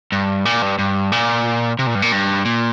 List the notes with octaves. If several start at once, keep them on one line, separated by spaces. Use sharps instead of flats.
G2
A#2
G2
G2
A#2
C3
A#2
G2
A#2
G2
A#2